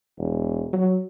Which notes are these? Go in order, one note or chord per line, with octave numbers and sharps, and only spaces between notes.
E1
F#3